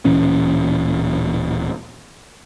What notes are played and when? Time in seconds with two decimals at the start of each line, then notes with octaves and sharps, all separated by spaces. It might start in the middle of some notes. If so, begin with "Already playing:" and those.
0.05 D1 A#2 E3 C#4